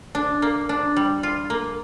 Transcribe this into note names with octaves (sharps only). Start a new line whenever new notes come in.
D4
A#3
D4
G3
F4
A#3